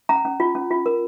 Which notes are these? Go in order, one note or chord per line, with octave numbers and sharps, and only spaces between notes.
C#4 A#5
C#4
F4
C#4
F4
A#4